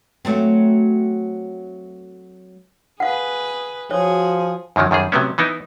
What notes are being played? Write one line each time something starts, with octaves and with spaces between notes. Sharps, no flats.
F#3 A3 C4
G#4 B4 F5 F#5
F3 F#4 G#4 C#5
F#2 D3 D#3 F3 F#3
F#2 D#3 G3 G#4
C3 F#3 A3 B3 C#4
E3 B3 D#4 E4